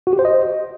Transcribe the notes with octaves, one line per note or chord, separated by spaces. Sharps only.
F#4
G4
C5
D#5